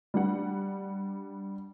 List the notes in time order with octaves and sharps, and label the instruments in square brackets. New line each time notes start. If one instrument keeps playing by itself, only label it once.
[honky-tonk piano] G3 D4 F#5